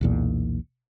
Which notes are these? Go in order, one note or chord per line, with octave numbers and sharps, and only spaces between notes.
B1 E2 A#2